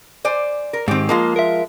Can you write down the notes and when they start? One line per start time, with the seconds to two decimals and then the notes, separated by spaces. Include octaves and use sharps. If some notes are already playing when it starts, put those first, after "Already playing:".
0.25 C5 D5 G#5
0.73 A#4
0.88 G#2 D#3 C4 G4
1.09 F3 G#3 A#3 F4
1.36 A#4 E5